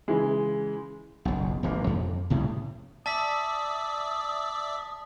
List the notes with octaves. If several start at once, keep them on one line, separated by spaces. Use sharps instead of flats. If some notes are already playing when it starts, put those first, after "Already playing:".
C#3 E3 G#3
F#1 B1
E1 A#1 A#3
F2
C2 A2 C#3
D5 E5 A5 D#6 B6